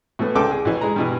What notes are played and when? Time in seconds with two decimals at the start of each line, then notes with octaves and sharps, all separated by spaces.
0.19 A2 E3 A3 B3
0.35 C2 C#3 A4 G5 D6
0.51 G#4
0.65 A1 E3
0.81 G#3 A#5
0.96 G2 B2 E3